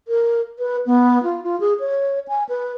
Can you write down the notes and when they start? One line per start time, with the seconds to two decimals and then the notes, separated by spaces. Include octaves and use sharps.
0.08 A#4
0.59 B4
0.86 B3
1.23 F4
1.44 F4
1.60 G#4
1.80 C#5
2.28 G#5
2.49 B4